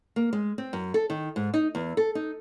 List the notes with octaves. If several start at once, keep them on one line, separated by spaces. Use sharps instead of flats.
A#3
G#3
C4
F#2
A4
D#3
G#2
D#4
E2
A4
D#4